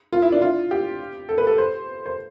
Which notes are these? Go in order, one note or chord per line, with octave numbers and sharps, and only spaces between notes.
F4
E4
D4
F4
G4
A4
B4
A4
C5
C5